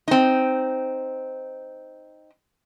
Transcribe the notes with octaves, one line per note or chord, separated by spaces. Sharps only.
C4 D#4